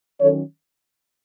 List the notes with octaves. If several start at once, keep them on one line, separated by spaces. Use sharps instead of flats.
D#3 F#3 C#4 A4 C#5